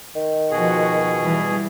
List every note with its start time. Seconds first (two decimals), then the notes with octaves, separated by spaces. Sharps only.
0.15 D#3
0.51 B2 F3 F#4 G#4
1.20 E3 G3